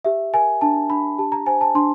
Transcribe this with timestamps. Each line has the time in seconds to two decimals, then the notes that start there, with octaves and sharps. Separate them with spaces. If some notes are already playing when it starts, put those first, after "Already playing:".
0.05 G4 E5
0.34 A#4 G#5
0.61 D4 A5
0.90 D4 B5
1.18 G4 A5
1.32 A#5
1.46 C5 G#5
1.61 A5
1.75 D4 C6